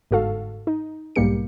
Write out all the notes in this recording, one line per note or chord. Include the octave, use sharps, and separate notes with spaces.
G1 G#2 F#4 A4 F5
D#4
B1 G#2 G3 A#3 G4 C#7